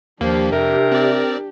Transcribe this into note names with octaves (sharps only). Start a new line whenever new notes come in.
D#2 F3 A#3 D4 G4
F2 C3 A#4
C4 D5